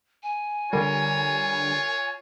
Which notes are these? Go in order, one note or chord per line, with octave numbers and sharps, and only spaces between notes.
G#5
D3 G3 F4 A#4 C#5